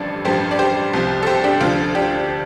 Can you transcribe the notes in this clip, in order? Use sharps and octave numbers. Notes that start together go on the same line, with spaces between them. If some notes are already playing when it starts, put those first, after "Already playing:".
Already playing: A1 G2 D3 F3 A4 D5
A1 G2 F3 G4 C5
D5
G4 C5
C2 C3 F3
A4
G4 C5
D4 G4
D2 D3 F3 F4
D4 G4